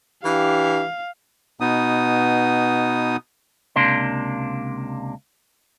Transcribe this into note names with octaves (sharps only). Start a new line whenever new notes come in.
E3 D4 G4 F5
B2 B3 D#4 D#6
C#2 C3 A#3 D4 C6